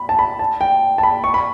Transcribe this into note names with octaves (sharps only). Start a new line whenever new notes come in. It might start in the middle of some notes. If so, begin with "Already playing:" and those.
Already playing: B5
A5
B5
A5
G5
A5
B5
C#6
B5